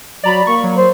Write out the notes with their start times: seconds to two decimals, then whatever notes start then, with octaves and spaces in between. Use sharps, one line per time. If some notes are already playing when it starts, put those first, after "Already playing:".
0.24 F#3 D5 A#5 B5
0.47 A#3 C#6
0.64 F#3
0.77 C5